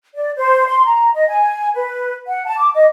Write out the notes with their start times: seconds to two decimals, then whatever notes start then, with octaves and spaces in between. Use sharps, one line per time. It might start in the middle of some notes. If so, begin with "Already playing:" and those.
0.15 D5
0.36 C5
0.68 C6
0.85 A#5
1.14 D#5
1.28 G#5
1.75 B4
2.27 F#5
2.45 A5
2.59 D6
2.75 D#5